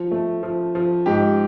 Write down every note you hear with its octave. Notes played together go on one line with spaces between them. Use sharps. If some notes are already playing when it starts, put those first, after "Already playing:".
Already playing: F3
A3
F3
F3
G#2 G4